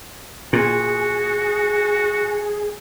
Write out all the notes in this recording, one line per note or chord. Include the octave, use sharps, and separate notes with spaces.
A#2 F#4 G#4